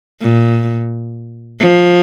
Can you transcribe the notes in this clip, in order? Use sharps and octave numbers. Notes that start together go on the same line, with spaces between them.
A#2
F3